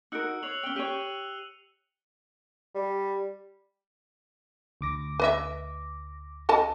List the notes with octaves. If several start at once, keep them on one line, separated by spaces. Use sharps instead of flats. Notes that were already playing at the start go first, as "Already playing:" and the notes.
D#4 F#4 A#4 E6 F#6 C#7
C#5 C7 F7 F#7
C#4 G5 F#7 G7
G4 C#5 F#6 D#7 F7
G3
D2 D6 A#6
B4 D#5 E5
A4 D#5 A5